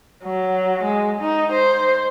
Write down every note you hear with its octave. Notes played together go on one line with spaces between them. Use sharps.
F#3
G#3
D#4
C5